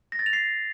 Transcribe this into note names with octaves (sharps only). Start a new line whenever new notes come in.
A#6
A6
F7
C7